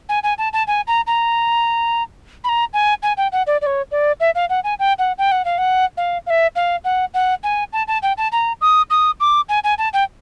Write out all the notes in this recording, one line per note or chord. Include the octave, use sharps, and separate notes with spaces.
G#5
G#5
A5
A5
G#5
A#5
A#5
B5
A#5
G#5
G#5
G5
F#5
D5
D5
C#5
D5
E5
F5
F#5
G#5
G5
F#5
G5
F#5
F5
F#5
F5
F5
E5
F5
F#5
F#5
G#5
A5
A5
G5
A5
A#5
D#6
D#6
D6
G#5
G#5
A5
G5